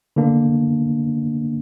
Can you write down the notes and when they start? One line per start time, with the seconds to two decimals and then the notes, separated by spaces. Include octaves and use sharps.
0.16 D3 A#3 D4